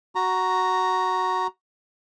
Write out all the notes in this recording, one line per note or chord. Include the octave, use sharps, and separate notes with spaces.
F#4 A#5